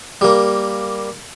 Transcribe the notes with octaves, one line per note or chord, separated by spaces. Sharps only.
G3 A#3